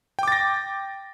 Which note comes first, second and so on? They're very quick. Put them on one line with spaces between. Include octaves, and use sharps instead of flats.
G5 D6 A6 A#6